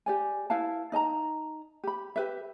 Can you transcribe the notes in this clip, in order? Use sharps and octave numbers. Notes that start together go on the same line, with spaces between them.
G4 D5 G#5
E4 B4 F5 A5
D#4 D#5 A5 A#5
G4 B5
G4 B4 E5